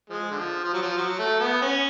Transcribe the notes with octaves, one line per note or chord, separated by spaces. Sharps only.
F3 G#3
D3 F3
F3
F#3
F3
F#3
A3
B3
C#4